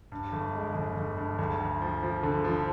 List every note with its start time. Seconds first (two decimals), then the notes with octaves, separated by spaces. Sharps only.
0.12 G2
0.32 G1
0.53 G#3
0.75 G1
0.96 G1
1.18 G2
1.39 D2 G#4
1.60 D2
1.82 F3
2.03 F3
2.23 D3
2.44 F3